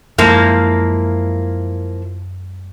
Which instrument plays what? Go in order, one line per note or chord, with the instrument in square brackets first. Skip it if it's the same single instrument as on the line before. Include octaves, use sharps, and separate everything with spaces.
[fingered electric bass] F#2 G#3 [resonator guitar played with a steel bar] F3 A#3 E4